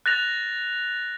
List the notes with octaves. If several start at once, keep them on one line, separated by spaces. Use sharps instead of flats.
F#6 A6 A#6 F7